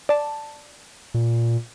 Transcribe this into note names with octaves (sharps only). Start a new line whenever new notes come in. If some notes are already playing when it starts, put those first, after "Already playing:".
D5 A5
A#2